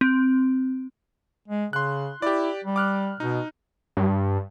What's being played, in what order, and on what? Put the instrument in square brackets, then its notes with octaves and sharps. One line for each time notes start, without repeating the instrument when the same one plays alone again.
[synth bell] C4
[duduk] G#3
[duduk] C#3 [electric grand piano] C6 F#6
[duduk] E4 [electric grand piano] G4 D5
[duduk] G3
[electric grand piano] D6 F6 F#6
[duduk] B2 [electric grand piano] D#4
[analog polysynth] G2